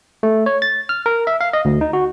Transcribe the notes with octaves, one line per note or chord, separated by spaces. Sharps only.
A3
C#5
A6
F6
A#4
E5
F5
D#5
D2
D#4
F#4